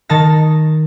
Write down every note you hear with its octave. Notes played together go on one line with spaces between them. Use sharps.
D#3 D#4 A5 A6 A#6